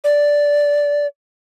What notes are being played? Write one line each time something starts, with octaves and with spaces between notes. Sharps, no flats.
D5